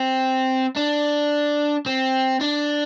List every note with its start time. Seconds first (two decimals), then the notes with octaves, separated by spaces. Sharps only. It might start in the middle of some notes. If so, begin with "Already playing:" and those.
Already playing: C4
0.76 D4
1.86 C4
2.41 D4